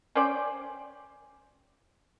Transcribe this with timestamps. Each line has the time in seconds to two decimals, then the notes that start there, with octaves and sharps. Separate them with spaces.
0.15 C#4 C5 D5 G5